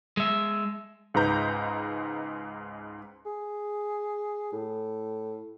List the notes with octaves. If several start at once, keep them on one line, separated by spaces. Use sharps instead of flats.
G#3 E5
C#2 G#2 B4 A#5 G6
G#4
A2